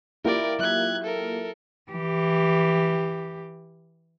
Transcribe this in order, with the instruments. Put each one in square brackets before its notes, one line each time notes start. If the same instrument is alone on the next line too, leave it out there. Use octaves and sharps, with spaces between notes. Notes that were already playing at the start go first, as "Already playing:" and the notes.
[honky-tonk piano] A#3 F4 G4 [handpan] E4 E5 [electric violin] A#4 D5
[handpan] F#3 E5 [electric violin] F#6 G#6
[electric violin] A4 A#4
[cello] E3 G4